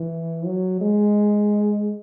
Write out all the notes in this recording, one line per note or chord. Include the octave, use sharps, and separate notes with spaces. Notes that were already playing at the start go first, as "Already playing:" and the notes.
Already playing: E3
F#3
G#3